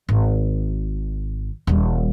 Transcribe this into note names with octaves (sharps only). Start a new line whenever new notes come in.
G#1
D#1 G3